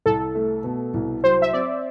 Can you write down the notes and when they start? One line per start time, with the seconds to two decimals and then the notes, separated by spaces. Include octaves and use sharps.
0.06 C2 A4
0.35 A3
0.64 B2
0.94 C2
1.23 F#3 C5
1.42 E5
1.53 C4 D5